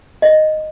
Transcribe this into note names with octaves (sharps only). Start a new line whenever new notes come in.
D#5